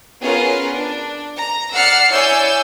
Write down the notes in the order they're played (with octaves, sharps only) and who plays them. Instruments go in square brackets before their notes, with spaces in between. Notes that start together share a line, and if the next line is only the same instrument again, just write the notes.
[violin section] B3 C#4 F4 G#4 A#4 B4
D4
A#5
D5 F#5 E6 F6 C7 C#7
E4 C#5 D5 G#5 E6 G6